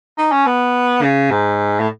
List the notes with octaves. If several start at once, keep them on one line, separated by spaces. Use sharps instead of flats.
D#4
C#4
B3
C#3
G#2
A2